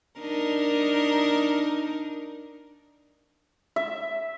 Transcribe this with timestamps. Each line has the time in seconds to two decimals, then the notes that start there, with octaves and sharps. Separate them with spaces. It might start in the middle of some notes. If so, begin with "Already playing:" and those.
0.19 D4 D#4 A#4
3.76 E5